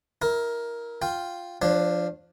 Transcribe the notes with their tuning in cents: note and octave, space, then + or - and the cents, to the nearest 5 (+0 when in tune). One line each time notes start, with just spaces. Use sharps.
E4 -20 A#4 +10
F4 +0 G5 +0
F3 +0 D4 +10 C#5 -40